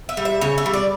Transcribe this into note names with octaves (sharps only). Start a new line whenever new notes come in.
E5
G3
E5
C#3 C#5
E5
G3
D5